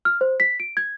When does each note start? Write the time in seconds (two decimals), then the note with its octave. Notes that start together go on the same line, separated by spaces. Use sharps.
0.05 F6
0.21 C5
0.40 B6
0.60 D7
0.77 G#6